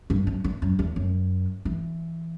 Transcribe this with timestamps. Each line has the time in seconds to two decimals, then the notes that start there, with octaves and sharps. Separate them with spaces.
0.10 G2
0.27 F#2
0.44 E2
0.62 F#2
0.79 E2
0.96 F#2
1.65 E3